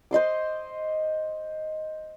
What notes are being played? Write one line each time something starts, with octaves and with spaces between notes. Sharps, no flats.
C5 D#5 C6 D6